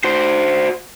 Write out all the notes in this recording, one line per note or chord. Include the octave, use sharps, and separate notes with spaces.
F#4 C5